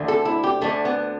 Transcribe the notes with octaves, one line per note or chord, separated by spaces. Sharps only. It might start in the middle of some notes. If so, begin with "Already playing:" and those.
Already playing: D2 D3
A4
E4
G4
D2 D3 A3
B3